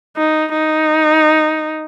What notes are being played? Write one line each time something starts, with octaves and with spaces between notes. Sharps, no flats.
D#4
D#4